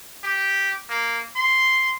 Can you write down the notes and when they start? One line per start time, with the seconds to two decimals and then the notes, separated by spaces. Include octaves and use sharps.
0.24 G4
0.89 A#3
1.36 C6